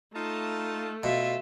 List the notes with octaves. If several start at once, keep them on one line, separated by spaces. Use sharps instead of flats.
A3 D#4 F4 A5
B2 F4 E5